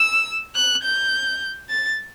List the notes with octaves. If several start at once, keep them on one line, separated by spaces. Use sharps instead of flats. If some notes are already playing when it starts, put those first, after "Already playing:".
Already playing: E6
F#6
G6
A6